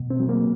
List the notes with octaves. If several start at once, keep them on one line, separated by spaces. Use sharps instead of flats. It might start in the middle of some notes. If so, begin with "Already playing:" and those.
Already playing: B2
C4
F#3
A#3